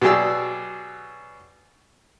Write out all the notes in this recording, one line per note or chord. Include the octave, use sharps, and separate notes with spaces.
B2 F#3 G4 G#4 D5 E6